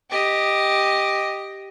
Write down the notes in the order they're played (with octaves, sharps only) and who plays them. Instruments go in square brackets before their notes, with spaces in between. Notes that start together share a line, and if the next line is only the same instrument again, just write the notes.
[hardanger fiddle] G4 D#5